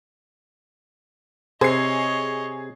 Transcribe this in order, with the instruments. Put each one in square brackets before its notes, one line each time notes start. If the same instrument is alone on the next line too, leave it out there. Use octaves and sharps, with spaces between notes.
[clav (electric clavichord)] C3 [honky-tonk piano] G#4 C7 [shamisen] C5 [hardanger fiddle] C#5 D#5